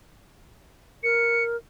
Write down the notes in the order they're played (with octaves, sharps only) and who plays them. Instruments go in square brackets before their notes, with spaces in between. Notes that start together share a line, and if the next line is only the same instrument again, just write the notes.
[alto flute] A#4 [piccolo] C#7